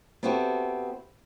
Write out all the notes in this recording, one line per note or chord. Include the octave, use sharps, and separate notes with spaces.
B3 C4 E4 F#4 G4 A4